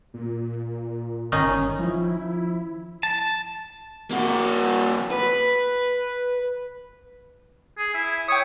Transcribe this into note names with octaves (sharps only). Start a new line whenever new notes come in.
A#2
G1 D#3 C#4 D#4
F3 E4
A5
A#3 F#4
B4
G#4
E4
C#5 G5 D#6